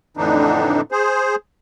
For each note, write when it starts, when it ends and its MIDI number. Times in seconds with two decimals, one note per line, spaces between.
0.17 0.81 41
0.17 0.81 45
0.17 0.81 50
0.17 0.81 52
0.17 0.81 62
0.17 0.81 63
0.92 1.35 68
0.92 1.35 72